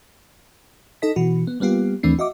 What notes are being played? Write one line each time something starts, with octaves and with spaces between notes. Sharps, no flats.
D#4 A4 D#5 B6
B2 E3 F#4
B3
G3 A#3 B3 F4 G4
D#2 E3 A3 C4 D4 C7
F#4 D#5 E5 D6